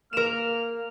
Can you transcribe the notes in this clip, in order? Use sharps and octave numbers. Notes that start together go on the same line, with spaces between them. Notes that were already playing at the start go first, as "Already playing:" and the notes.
A#3 A#4 F6 E7